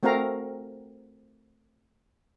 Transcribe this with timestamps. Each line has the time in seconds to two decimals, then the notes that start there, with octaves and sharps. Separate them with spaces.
0.03 A3 C4 F#4 A#4 F5 A#5